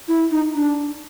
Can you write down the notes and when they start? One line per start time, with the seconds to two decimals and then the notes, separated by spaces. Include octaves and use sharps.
0.08 E4
0.31 D#4
0.55 D4